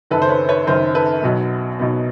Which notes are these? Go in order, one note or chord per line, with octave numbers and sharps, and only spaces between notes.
F#1 F#2 D#3 A4 B4
C5
B4 C#5
B4 C#5
F#1 F#2 D#3 A#4 C5
A4 B4
B1 B2 F#3 B3
B1 B2 F#3 B3